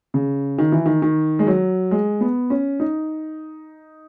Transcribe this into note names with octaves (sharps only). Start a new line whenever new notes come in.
C#3
D#3
E3
D#3
D#3
G#3
F#3
G#3
B3
C#4
D#4